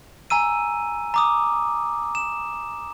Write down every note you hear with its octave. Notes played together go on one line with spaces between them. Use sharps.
G#5 A#5 E6 D#7
A#5 D6 D#6
E7